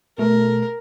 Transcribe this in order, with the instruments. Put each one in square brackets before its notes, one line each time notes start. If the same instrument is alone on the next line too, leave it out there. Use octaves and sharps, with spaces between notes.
[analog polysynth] B2 A3 [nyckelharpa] A#4